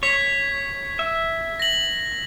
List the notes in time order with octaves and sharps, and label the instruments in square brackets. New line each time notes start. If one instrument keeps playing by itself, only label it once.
[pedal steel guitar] C#5 [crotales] G#6 B6
[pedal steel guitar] E5
[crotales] A#6 F#7